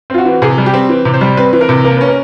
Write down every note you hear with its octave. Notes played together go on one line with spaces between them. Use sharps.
C4 F4
F#4
E3
C3 G#4
G3
G4
C4
E3
C3
C5
G3
C4 B4
E3
A#4
C3
A#3 A#4
C#4 B4
A#4